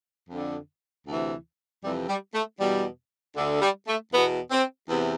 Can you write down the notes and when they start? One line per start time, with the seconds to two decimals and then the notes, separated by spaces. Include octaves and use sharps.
0.30 F2 D3
1.07 D2 C3 E3
1.83 F2 C3 E3 G3
2.08 G3
2.34 A3
2.60 E2 B2 G3
3.35 D2 D3
3.62 G3
3.87 A3
4.13 E2 B2 B3
4.50 C4
4.89 E2 C3 E3 B3